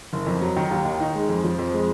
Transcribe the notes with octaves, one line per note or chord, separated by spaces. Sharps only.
F#1
F2
F#3
D#3
D#2
D#3
D#4
G#3
F2
F3
F2
G#3